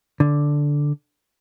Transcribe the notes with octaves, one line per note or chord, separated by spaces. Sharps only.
D3